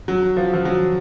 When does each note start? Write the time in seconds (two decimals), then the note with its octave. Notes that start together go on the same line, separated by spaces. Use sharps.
0.08 F#3
0.37 F3
0.54 F3
0.65 F#3